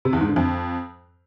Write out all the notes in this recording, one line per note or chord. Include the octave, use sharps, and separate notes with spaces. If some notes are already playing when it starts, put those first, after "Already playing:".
C3
E2
G#2
D3
F2